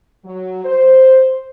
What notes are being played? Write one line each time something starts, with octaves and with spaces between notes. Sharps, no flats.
F#3
C5